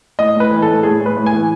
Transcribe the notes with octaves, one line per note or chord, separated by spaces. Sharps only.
A2 D#5
A2 B4
E3
A2 A4
A2 G#4
A2
B4
A2
G#5
E3